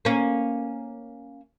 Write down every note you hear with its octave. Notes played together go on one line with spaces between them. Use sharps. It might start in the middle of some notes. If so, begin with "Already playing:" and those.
A#3 C#4